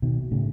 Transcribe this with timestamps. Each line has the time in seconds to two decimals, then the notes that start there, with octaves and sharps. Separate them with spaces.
0.02 B2 D#3
0.31 A2 C#3